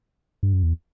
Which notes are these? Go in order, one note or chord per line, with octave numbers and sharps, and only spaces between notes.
G2
F#2
E2